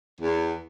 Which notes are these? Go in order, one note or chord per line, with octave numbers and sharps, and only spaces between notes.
E2